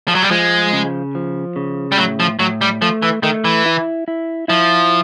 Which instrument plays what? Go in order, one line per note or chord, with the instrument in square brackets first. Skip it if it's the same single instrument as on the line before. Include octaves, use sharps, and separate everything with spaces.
[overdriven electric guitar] F3
F#3
G3
[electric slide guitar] F3 [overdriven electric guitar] G#3
[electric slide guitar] C#3
F3
C#3
[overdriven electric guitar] G3
[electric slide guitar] A2 [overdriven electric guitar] F#3
[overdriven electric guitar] F3
[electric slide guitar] A2 [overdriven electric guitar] F#3
[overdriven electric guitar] G3
[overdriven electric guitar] F3 [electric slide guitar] A3
[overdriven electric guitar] E3
[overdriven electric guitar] D#3 [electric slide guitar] A3
[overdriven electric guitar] E3
[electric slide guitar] E4
E4
[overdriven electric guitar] F3 [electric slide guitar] E4